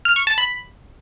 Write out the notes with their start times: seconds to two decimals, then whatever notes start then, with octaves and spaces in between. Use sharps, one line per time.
0.05 F6
0.16 C#6
0.27 A5
0.38 B5